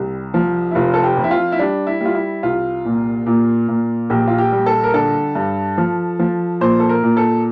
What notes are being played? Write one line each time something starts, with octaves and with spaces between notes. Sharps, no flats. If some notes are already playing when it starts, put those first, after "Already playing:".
Already playing: C2 G3
F3
E4
F1 F4
A4
G4
F2
E4
F4
E4
G3 D4
E4
G3 F4
E4
C2 F4
A#2
A#2
A#2
A#1 G4
F4
G4
G3
A4
A#4
D3 A4
G2
F3
F3
A#2 C5
A4
A#4
A#2
A4